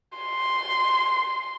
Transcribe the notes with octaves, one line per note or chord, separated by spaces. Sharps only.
C6